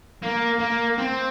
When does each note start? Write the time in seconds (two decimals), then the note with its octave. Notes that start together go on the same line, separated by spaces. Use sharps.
0.22 A#3
0.60 A#3
0.98 C4